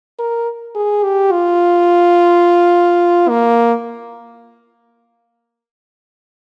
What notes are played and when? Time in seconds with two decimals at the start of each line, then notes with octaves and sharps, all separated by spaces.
0.19 A#4
0.75 G#4
1.03 G4
1.32 F4
3.29 A#3